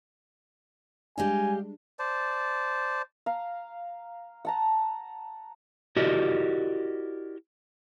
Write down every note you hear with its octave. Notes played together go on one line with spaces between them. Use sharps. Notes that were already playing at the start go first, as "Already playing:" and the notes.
G3 G#3 D4 G4 D#5 F5 G#5
C5 D5 A5
F5 A#5
F#5 A5 A#5
E4 F#4 G4 A#4 D5 D#5